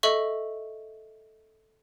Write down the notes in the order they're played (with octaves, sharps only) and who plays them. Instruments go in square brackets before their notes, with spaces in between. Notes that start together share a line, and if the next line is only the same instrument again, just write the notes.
[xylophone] A4 D#5 E5 C#6